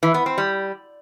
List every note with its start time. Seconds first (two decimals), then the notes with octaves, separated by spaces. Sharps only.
0.03 E3
0.14 B3
0.26 C4
0.38 G3